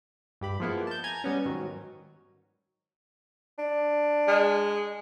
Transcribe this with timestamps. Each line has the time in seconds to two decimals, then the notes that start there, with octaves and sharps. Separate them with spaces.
0.41 G2 G4 B5
0.60 F3 G#3 A#3 B3 E4
0.87 A5 G6
1.04 G#5 A#5 G#6
1.24 G3 B3 C#4
1.46 G#2 D#3 F#3
3.58 D4
4.28 G#3